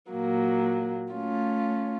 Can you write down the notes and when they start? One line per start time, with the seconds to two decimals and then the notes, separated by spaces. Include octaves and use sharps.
0.11 A#2 F#3 A#3
1.13 A3 C#4 F4